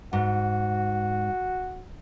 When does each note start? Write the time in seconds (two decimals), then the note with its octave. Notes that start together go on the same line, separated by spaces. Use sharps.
0.13 G#2 F#4